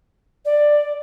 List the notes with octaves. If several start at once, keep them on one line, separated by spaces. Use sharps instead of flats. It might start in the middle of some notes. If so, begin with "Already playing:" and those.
D5